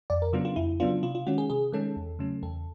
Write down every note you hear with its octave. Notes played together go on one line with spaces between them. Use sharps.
F2 D5
A#4
C#3 F#3 B3 D4 F4
F4
F2 E4
C#3 F#3 B3 D4 F4
C3 F4
F4
D#3 G#3 C#4 F#4
G#4
C3 G#4
D#3 G#3 C#4 A4
E2
C#3 F#3 A3 C#4
E2 A4